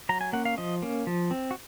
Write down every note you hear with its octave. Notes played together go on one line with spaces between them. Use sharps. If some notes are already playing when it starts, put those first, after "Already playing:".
F#3 A#5
G#5
A#3 C#4 F#5
F5
F3 D#5
A#3 C#4
F3
C4
F#4